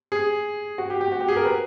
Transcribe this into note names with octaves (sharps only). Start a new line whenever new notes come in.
G#4
F#4
G4
G4
F#4
G4
G#4
A#4
B4